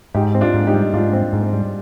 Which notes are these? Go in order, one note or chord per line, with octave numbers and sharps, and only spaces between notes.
G#2 D#4 G4
C4
D4 F4
G#2
D#4 G4
G3
G#2 D4 F4
C4
G#2
G3